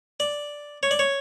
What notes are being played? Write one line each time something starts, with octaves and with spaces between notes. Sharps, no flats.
D5
C#5
D5
C#5